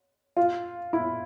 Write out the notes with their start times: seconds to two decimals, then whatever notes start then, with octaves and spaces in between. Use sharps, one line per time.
0.37 F4
0.93 E4